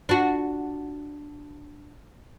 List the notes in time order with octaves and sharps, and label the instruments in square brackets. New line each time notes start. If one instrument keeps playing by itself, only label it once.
[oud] D4 F#4